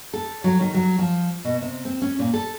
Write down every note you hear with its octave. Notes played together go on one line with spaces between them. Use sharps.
A4
F#3
D#3
F#3
F3
B2
C3
C4
C#4
A#2
A4